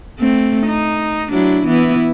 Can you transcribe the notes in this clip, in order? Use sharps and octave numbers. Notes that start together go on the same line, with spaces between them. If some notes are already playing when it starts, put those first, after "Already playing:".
A3 C4
D#4
F#3 D4 E4
E3 B3 E4